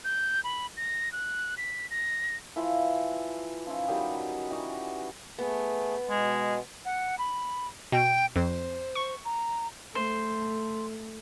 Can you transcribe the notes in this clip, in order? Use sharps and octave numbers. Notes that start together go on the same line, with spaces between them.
G6
B5
A#6
F#6
B6
A#6
E3 F3 E4
F3 C#4 D#4 E4
D#3 F#3 G3 D#4
B5
E3 G3 D#4 F#4
A3 B3 G#4
B2 G#3
F#5
B5
B2 G5
F2 C5
C#6
A#5
A3 C5